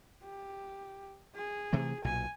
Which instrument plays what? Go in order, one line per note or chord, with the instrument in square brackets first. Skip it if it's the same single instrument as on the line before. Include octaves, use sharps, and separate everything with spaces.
[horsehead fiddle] G4
G#4
[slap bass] C3 E3 A3
[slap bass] B1 A#2 [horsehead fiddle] G#5